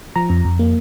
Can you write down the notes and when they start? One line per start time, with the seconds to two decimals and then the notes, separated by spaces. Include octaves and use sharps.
0.16 F3 A#5
0.30 F2
0.45 F2
0.59 A#3